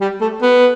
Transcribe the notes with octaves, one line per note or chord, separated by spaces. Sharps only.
G3
A3
B3